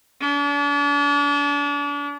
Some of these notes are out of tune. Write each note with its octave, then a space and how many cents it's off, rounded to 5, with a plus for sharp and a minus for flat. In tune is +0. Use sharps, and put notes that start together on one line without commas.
D4 -40